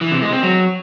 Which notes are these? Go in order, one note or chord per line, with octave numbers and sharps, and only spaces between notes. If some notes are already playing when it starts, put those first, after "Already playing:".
E3
C3
G#3
C4
F#3